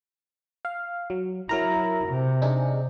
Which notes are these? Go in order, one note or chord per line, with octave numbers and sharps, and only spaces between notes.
F5
F#3
F#3 E4 A#4 A#5
C3
D4 D#4 G#4